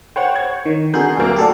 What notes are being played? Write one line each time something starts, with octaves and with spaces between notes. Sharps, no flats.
C5 C#5 F#5 G5
C#5 G#6
D#3
D3 F#4 G#4 A#4 G6
D2 F#3 A#3
A3 F#4 G4 A4 D5